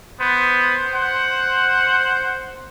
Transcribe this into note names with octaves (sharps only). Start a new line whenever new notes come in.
B3 C5
F#5